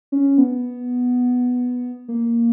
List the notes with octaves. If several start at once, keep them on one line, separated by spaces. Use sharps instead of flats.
C#4
B3
A#3